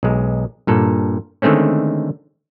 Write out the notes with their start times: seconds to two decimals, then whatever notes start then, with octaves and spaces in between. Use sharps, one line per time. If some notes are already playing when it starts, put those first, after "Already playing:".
0.03 B1 G#3
0.67 G2 A#2 A4
1.42 D3 D#3 G#3 A3 C4 C#4